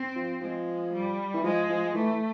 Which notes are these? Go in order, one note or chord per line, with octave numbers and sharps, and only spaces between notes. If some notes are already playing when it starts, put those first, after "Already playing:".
Already playing: C4
F3
F3 G#3
G3
E3
F3 G#3
F3
E3 A3